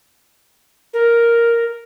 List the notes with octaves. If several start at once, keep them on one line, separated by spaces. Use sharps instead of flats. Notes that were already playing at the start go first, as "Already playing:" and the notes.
A#4